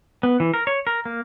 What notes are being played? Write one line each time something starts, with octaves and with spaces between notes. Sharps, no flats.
B3
E3
A#4
C#5
A#4
A#3